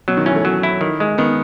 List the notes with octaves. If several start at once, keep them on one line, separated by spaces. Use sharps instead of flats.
B2 F#3
D#3
E3 C#4
A3
F#3
E4
D#3
G#3
D#3 B3